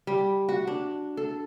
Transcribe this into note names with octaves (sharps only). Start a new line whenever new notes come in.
G3
F#4
D4
A4